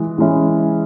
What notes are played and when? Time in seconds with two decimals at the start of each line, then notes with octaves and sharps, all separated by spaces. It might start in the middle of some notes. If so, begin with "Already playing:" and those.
Already playing: E3 G#3
0.18 E3 G#3 C#4 E4